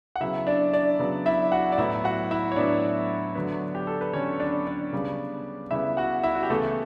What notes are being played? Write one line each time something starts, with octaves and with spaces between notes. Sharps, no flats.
F#5
C#3 F#3 B3 E4 E5
D4 D5
D4 D5
C#3 F#3 B3
E4 E5
F#4 F#5
D5
A2 F#3 B3 E4 E5
F#4 F#5
E4 E5
C#5
A2 F#3 B3 D4 D5
D3 F#3 B3
G4
A4
B4
D3 F#3 B3 C#4 C#5
D4 D5
D4 D5
C#3 G3 B3
C#3 G3 B3 E4 E5
F#4 F#5
E4 E5
F#4
G4
C#3 E3 A3 B3 A4